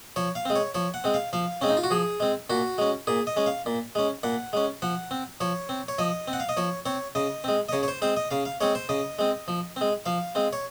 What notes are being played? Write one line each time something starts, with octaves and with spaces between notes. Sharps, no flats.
F3 C#5
F5
G#3 C4
C#5
F3 C#5
F#5
G#3 C4
F5
F3 F5
G#3 C4 C#4
D#4
F4
F#4
F3 G#4
G#3 C4
A#2 F#4
G#3 C#4
A#2 G#4
D#5
G#3 C#4
F5
A#2
G#3 C#4
A#2 F#5
G#3 C#4
F3 F#5
C4
F3 C#5
C4
C#5
F3 D#5
C4
F#5
F5
D#5
F3 C#5
C4 C#5
C#3 D#5
G#3 C4
D#5
C#3 C#5
C#5
C5
G#3 C4 C5
D#5
C#3 F5
F5
G#3 C4 C#5
C5
C#3 D#5
G#3 C4
F3
G#3 C4
F3 F5
G#3 C4
C#5